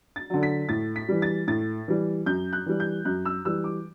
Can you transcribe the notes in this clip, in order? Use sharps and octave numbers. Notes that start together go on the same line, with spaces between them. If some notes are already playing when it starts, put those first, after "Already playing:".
A6
D3 F#3
B6
A2 A6
B6
E3 G3
A6
A2 A6
E3 G3
F#2 G6
F#6
E3 G3
G6
F#2 F#6
E6
E3 G3 E6
D6